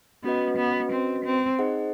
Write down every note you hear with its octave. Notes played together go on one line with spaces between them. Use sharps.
B3 C#4 F#4 B4 D#5
B3
C4
C4
D#4 G#4 C5 D#5 F#5